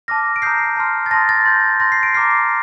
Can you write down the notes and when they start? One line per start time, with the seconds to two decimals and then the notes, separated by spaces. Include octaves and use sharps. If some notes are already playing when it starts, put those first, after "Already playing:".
0.08 A5 D6 F6 A#6
0.36 D7
0.42 A#5 D#6 G6 C7
0.77 A5 C6 F6
1.06 A6
1.11 A5 C6 D#6 A#6
1.29 A6
1.45 C6 G6
1.80 C6 G6 A#6
1.92 C7
2.03 D7
2.14 A#5 D6 F6 C7